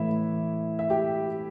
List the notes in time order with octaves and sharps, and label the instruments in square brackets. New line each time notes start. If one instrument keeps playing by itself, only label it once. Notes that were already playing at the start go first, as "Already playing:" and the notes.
Already playing: [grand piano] A2 E3 E4 E5
E5
G4 G5